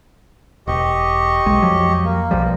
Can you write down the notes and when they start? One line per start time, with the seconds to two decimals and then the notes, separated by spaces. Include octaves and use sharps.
0.67 E1 G4 D#5 C#6
1.46 B1 G#3
1.62 F2 F3 F#3
2.04 A#3
2.31 B1 F3 G3